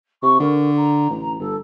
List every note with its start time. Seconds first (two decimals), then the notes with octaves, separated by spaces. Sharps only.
0.23 C3 C#6
0.40 D3 A#4
0.77 A#5
1.10 A1
1.39 G1 A4